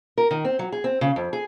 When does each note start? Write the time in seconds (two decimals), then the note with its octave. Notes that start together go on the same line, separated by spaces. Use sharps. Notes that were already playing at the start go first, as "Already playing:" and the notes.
0.18 A#4
0.31 D#3
0.45 C4
0.59 F#3
0.72 G#4
0.84 C4
1.01 C#3
1.16 F2
1.33 G#4